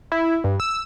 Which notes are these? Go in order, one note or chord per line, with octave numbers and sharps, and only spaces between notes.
E4
G2
E6